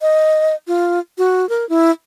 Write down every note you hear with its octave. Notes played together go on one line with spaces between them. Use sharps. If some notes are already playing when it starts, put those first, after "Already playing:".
D#5
F4
F#4
A#4
E4